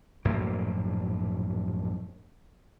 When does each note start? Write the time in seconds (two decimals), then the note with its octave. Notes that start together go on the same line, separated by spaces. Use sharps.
0.25 A#1 F#2 A2 A#3